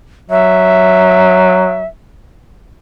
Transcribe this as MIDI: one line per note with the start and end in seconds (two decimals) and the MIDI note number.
0.30 1.86 54
0.30 1.85 76